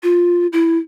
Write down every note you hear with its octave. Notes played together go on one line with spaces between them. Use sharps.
F4
E4